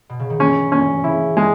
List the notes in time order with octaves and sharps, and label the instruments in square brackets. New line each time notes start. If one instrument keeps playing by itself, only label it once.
[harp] B2
C#3
D#3
[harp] E3 [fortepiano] C#4
[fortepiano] C#4
[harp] C#3 [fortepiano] E4
[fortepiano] G#3